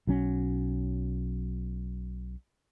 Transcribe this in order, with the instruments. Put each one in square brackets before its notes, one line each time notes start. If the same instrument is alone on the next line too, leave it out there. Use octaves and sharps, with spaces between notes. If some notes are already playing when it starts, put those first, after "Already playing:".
[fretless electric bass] B1 F#3 C#4